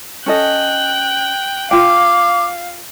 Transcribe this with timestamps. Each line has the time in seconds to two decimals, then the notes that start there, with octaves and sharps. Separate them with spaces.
0.26 C#4 A4 D#5 G5 F#6
1.71 F4 F5 G5 D6